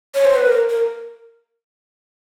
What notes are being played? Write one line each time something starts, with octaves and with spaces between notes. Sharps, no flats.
C#5
C5
B4
A#4
A#4